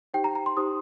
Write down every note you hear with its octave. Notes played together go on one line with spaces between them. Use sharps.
D#4 G4 C5 G5
A#5
A#5
C6
D#4 G4 C5 D#6